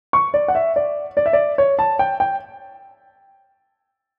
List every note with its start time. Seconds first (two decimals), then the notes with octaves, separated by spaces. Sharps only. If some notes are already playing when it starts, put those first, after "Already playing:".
0.13 C#6
0.34 D5
0.48 F#5
0.55 E5
0.76 D5
1.17 D5
1.26 E5
1.33 D5
1.58 C#5
1.79 A5
1.99 G5
2.20 G5